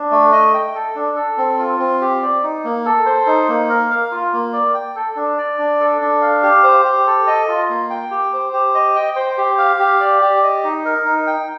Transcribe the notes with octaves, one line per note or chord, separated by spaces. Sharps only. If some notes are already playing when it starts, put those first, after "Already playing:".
Already playing: D4
A3
D#5
G5
A4
D4
A4
C4
F4
C4
G4
D5
D#4
A#3
A4
C5
D#4
A#3
A#4
F5
F4
A#3
D5
G5
A4
D4
D5
D4
A4
D4
F5
G4
C5
G4
A4
D#5
F4
A#3
G5
G4
C5
G4
D#5
G5
C5
G4
F5
G4
D5
G4
D#5
D#4
A#4
D#4
G5